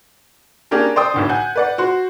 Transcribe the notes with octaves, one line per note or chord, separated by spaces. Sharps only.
A#3 C#4 D4 G4 G#4 A#4
C5 D5 G5 D#6
B1 A2 D3
F#5 G#5 G6
B4 D5 F#5
F#4 C5